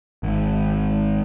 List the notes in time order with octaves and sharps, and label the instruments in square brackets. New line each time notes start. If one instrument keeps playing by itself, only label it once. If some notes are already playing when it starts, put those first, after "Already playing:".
[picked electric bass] G#1